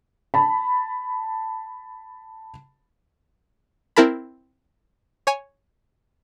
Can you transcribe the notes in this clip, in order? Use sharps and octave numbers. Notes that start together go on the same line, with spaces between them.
A5 B5
C4 E4 A#4 A5 B5
C#5 G#5